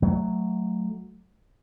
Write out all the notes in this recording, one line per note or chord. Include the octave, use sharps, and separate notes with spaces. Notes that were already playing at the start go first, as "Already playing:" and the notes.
F#3 A3